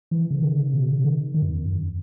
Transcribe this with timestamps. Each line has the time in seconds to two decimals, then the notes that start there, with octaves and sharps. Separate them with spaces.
0.11 E3
0.30 C#3
0.42 D#3
0.57 C#3
0.73 B2
0.88 C#3
1.04 D#3
1.34 D#3
1.42 F#2
1.50 E2
1.66 F#2